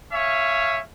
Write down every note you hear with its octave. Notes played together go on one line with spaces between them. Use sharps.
C#5 E5 F5 G#5